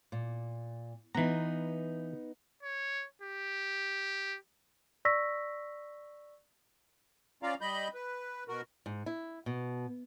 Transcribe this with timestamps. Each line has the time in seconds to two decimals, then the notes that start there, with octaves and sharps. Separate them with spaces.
0.12 A#2
1.15 E3 B3 D#4 A#5
2.63 C#5
3.22 G4
5.05 D5 C#6 E6 A#6 B6
7.43 C#4 F4 D5 F5 A#5
7.61 G3 D#5 B5 G6
7.94 B4
8.48 B2 F#4 A#4
8.86 G#2
9.06 E4
9.46 B2